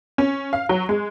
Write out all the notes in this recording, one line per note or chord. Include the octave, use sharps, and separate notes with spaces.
C#4
F5
F#3
G#3